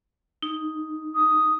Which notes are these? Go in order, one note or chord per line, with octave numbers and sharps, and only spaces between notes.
D#4
D#6